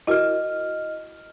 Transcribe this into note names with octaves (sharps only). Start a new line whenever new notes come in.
E4 F#4 A#4 D#5 F6